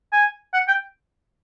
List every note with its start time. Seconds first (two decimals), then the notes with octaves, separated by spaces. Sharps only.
0.13 G#5
0.54 F#5
0.68 G5